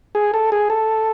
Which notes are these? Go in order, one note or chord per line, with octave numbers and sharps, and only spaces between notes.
G#4
A4
G#4
A4